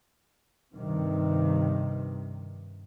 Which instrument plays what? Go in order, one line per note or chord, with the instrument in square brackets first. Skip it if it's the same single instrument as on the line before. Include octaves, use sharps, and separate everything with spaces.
[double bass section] G2 C3 D#3